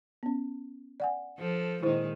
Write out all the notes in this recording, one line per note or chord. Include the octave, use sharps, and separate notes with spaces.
B3 C#4
D5 F#5 G#5
F3 A4
A#2 D#3 G#3 E4 C5